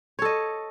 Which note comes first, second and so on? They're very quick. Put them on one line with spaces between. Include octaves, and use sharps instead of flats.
C#5 A4 D#5